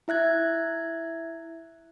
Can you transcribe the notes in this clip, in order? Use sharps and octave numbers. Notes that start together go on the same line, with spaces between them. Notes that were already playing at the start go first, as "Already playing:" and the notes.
E4 E5 F#6 G#6